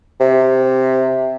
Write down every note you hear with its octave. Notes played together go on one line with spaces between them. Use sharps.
C3